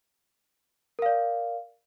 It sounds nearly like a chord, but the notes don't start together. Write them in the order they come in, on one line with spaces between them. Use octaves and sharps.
A#4 F5 D5